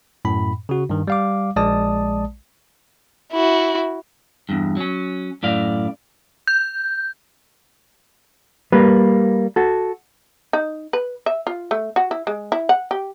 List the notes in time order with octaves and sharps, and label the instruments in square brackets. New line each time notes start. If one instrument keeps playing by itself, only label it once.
[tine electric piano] F#2 A2 B5
C#3 F#4
G2 D#3
G3 F5 D6
A#1 G#3 D5 A5 D#6
[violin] E4 F#4
[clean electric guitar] E2 G2
F#3 C#4
F#2 A2 D5 F5
[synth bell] G6
[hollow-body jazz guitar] G3 A#3 B4
F#4 A4
[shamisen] D#4
B4
E5
F4
A3
F#4
E4
G#3
E4
F#5
G4